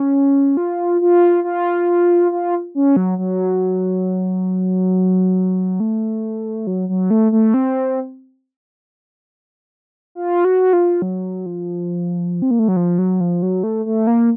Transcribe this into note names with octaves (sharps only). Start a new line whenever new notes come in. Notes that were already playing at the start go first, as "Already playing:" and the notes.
Already playing: C#4
F4
F4
F4
F4
C#4
F#3
F#3
A3
F#3
F#3
A3
A3
C4
F4
F#4
F4
F#3
F3
C4
A#3
A3
F#3
F3
F#3
F3
F#3
A3
A3
A#3